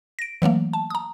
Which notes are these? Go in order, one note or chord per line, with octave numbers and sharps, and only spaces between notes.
A#6 D7
E3 F#3 A3 A#3
A5
A#5 D#6